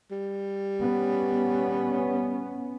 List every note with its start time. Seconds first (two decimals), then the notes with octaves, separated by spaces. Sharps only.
0.11 G3
0.80 B3 C#4